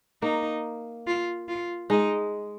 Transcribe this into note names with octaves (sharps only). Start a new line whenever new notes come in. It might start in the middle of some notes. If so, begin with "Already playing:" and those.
A#3 D#4
F4
F4
G#3 D#4